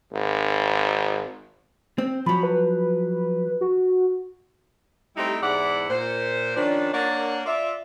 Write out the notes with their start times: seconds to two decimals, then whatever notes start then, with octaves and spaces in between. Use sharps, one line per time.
0.12 G#1
1.98 C4
2.26 F3 F#3 B5
2.43 B4
3.61 F#4
5.16 G3 A3 C4 D#4 E4 G4
5.42 E2 G#2 E4 D5 F#5
5.90 A#2 C5
6.57 D#3 F3 C#4 D4
6.93 A#3 D4 A#4 C#5 D5 F#5
7.46 F4 D5 E5